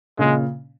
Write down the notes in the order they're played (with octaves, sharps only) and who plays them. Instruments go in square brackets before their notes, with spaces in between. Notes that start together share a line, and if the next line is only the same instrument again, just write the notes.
[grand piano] A#2 C#3 [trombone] G#3